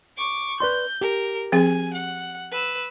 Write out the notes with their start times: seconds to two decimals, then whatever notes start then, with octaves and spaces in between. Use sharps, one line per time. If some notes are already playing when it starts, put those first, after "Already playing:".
0.17 C#6 D6
0.60 B4 D5 C6 G6
1.01 G4 A#4
1.52 F3 C4 G#4 G#5
1.94 F#5
2.51 B4 E6